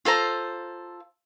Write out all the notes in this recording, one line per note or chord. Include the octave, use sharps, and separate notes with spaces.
F4 A4 C5 A#5